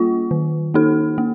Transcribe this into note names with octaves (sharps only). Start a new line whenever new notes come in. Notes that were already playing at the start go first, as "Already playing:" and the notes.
Already playing: G3 A#3 F4
D#3
A#3 D#4 A4
A#3